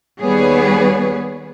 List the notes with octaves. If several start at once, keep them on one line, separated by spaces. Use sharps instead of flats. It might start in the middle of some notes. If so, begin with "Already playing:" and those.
D#2 G3 B3 G#4 B4 C#5